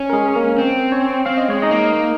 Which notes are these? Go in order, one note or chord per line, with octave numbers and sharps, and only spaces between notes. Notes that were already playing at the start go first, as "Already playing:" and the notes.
Already playing: C#4
A#4
G#3 G#4
A#3 A#4
C4
C#4 C#5
C4 F5
D#5
G#3 C#5
D#4 D#5
A#3
A#3